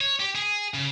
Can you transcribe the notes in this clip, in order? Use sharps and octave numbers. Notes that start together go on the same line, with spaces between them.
C#5
G4
G#4
C#3